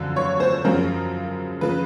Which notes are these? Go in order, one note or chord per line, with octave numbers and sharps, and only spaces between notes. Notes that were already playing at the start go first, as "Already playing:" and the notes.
Already playing: F#2 D3 F3
C#5
C5
F#2 C#3 F3 A#4
C#3 F3 B4